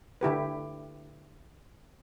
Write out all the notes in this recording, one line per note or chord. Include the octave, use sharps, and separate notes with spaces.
D3 E4 G4 B4